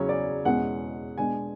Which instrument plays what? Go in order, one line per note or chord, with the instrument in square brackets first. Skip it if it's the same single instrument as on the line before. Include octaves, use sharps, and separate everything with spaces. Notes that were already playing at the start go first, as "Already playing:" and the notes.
Already playing: [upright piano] E2 C#3 F#3 C#4 C#5
D5
E2 B2 G#3 C#4 F#5
B2 G#3 D4 G#5